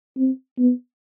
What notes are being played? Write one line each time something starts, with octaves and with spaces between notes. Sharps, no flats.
C4
B3